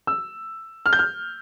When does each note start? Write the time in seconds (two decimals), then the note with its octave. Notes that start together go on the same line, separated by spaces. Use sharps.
0.07 E6
0.86 F6
0.93 G6
0.99 F6